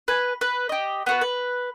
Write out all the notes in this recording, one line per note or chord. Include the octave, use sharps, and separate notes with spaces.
B4 G#5
B4
G4 D#5
B3 F#4 B4
B4